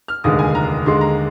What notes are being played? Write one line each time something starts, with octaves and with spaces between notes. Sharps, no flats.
F6
F1 D#2 D3 G#3 D#6
G#5
A#5
D#2 D3 G#3 C6
A#5